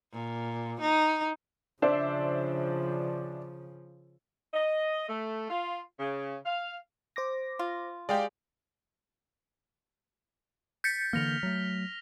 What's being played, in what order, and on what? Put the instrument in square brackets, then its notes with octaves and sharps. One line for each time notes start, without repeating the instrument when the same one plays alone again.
[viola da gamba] A#2
D#4
[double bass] C#3 F3 [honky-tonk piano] D4 C5 E5
[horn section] D#5
A3
F4
C#3
F5
[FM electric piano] C5 D6 A#6
[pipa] F4
[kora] G#3 G4 [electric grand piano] D5 F5 G5
[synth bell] G6 A6 C#7 [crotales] B6
[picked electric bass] D3 E3 A#3 [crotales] F6 A#6 F7
[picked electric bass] F#3 A3